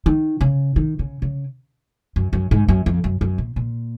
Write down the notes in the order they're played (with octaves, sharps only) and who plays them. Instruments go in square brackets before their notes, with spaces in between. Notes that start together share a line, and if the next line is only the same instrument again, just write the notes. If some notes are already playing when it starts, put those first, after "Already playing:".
[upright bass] D#3
C#3
D#3
C#3
C#3
F#2
F#2
G#2
F#2
F2
F#2
F#2
A#2
A#2